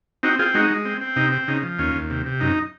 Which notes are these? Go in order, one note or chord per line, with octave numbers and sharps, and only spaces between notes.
C4 D#4 F#4
C4 F4 G#4
G#3 D#4 F#4
G#3
C4
C4
C3 D#4
C4
C#3 D#4
F3
D#2 C#4 F4
D#2
C3
C3
F#2 D#4